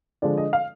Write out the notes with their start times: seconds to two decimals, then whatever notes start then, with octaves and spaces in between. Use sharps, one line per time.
0.22 D3 F3 G#3 D5
0.38 D#5
0.53 F5